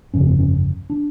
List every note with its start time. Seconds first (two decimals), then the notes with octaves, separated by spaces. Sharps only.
0.14 G1 F2 C#3 C#4
0.27 C4
0.39 C#4
0.90 D4